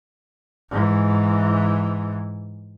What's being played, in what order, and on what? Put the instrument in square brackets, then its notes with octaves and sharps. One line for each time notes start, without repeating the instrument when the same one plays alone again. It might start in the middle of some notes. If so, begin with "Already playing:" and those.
[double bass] G#2 E3